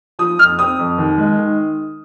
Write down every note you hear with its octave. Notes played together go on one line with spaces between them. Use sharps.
F3 D#6
F2 F6
C4 D#6
F2
D#2
G#3
D#3